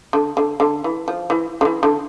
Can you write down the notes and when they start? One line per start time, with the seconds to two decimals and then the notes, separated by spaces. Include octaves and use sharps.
0.13 D3
0.37 D3
0.60 D3
0.84 E3
1.08 F3
1.30 E3
1.61 D3
1.65 E3
1.83 D3